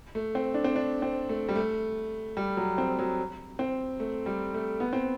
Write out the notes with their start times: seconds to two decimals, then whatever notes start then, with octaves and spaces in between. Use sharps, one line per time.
0.15 A3
0.35 C4
0.54 D4
0.64 C4
0.76 D4
1.02 C4
1.29 A3
1.49 G3
1.56 A3
2.37 G3
2.57 F#3
2.78 C4
2.99 F#3
3.59 C4
4.00 A3
4.26 G3
4.54 A3
4.80 B3
4.93 C4